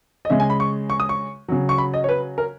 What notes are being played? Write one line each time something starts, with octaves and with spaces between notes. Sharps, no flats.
D#5
C#3 G#3 E5
G#5
B5
C#6
C#6
D#6
C#6
C#3 F#3
C#6
B5
D#5
C#5
B4
A#4